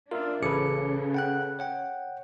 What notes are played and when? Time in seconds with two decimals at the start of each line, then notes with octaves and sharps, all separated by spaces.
0.11 D4 F4 A#4 E5 F5
0.42 A1 C#3 G#4 A4 B4 D6 C#7
1.14 F#5 G5 F#6
1.59 C#5 F#5 G5